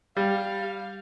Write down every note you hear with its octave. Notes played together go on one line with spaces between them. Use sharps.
G3 F5